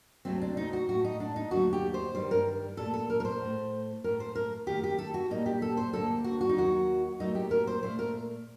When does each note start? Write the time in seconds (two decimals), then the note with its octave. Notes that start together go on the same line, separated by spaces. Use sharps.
0.25 D2 C3 F#3 A3 C4
0.42 D4
0.57 D#4
0.73 F#4
0.89 A2 A3 F#4
1.04 D#4
1.20 D4
1.36 D#4
1.51 D#2 D3 F#3 A3 F#4
1.73 G4
1.94 C5
2.15 G2 D#3 G3 C5
2.31 A#4
2.77 A#2 A3 A4
2.94 A4
3.10 A#4
3.20 A#4
3.25 C5
3.41 A2 A3
4.04 A2 A3 A#4
4.20 C5
4.35 A#4
4.67 F#2 D#3 A3 G4
4.84 G4
4.99 A4
5.14 F#4
5.30 A#2 G3 A#3 D#4
5.46 G4
5.62 A4
5.77 C5
5.93 D2 D3 G3 A#3 A4
6.24 F#4
6.41 F#4
6.49 D#4
6.56 D#2 D#3 F#3 F#4
7.20 A#2 F#3 A3 D#4
7.35 G4
7.51 A#4
7.67 C5
7.82 A#2 A3 C5
7.99 A#4